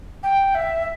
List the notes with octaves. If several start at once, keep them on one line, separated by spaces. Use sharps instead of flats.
G5
E5